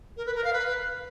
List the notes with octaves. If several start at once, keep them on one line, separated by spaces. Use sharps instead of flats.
A#4
B4
A#4
F5
B4